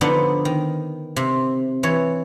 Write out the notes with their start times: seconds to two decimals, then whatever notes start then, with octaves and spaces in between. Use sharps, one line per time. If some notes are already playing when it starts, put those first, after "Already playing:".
0.01 D3 F3 B3 D4 D#4 D5
0.45 D#3
1.16 C3
1.83 E3 C#5